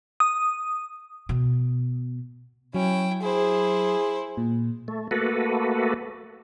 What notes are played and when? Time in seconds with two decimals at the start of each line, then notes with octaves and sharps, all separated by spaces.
0.20 D#6
1.29 B2
2.74 F#3 C#4 E4 G5
3.22 E4 G#4 C5
4.37 A#2
4.88 A3
5.11 A3 A#3 F#4 A4 B4